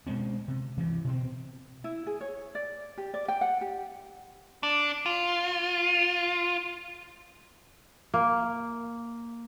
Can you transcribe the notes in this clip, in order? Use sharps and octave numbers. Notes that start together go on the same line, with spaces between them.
B2 G#3 C4 C#4
C3
D2 G2 E3
B2 C4
E4
G#4
C#5
D5
G4
D5
G5
F#5
G4
D4
F4
A#3